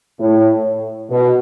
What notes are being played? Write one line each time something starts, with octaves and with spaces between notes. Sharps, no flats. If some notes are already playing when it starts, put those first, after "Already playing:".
A2
B2